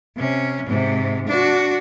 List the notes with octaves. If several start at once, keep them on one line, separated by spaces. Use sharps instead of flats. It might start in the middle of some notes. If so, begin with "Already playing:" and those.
C3 C#4
G#2 C3
D4 F#4